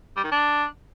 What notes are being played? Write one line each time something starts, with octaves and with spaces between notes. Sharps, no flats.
G3
D#3
D4